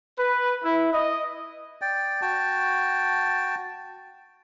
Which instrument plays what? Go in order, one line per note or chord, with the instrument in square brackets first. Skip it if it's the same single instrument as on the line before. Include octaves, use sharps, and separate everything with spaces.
[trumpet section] B4
E4
D#5
[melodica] D5 G5
F#4 G5 A5